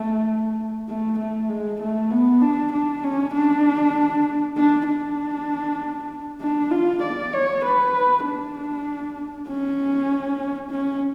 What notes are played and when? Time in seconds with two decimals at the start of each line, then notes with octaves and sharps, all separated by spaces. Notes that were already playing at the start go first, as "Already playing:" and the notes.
Already playing: A3
0.88 A3
1.19 A3
1.49 G#3
1.80 A3
2.11 B3
2.42 D4
2.72 D4
3.03 C#4
3.34 D4
4.57 D4
4.87 D4
6.41 D4
6.71 F4
7.02 D5
7.33 C#5
7.64 B4
8.25 D4
9.48 C#4
10.71 C#4